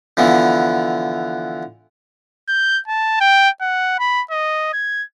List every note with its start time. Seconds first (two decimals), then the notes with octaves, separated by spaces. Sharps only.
0.17 D3 E3 F3 B3
2.48 G6
2.88 A5
3.21 G5
3.61 F#5
3.99 B5
4.31 D#5
4.73 G#6